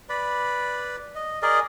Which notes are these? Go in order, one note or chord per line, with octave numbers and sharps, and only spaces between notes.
B4 D5 B5
D#5
G#4 A#4 D5 D#5